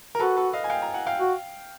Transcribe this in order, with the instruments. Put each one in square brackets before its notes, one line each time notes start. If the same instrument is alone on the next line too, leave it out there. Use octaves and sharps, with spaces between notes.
[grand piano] A#4
[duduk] F#4 [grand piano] A4 B4
[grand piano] A4 B4
D#5 F5
G#5
F5 G5
G#5 A#5
F#5 G#5
F5 G5
[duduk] F#4